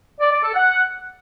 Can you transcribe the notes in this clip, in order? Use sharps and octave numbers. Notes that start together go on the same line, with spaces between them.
D5
D5
A4
F#5